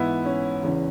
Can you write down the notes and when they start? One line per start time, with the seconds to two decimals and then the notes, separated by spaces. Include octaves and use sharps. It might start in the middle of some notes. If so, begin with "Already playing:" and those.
Already playing: G#2 E3 B3 E4
0.25 C#4
0.63 E2 C#3 E3